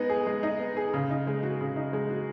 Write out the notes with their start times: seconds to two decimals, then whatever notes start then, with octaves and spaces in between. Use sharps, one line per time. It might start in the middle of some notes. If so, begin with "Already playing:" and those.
Already playing: G#3 B3 D#4
0.10 G#4
0.27 G#3
0.43 D#4
0.59 B3
0.77 G#4
0.93 C#3
1.10 D#4
1.27 G#3
1.43 F#4
1.60 C#3
1.76 D#4
1.93 G#3
2.10 F#4